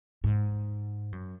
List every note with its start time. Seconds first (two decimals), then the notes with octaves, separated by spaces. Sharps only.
0.24 G#2
1.13 F#2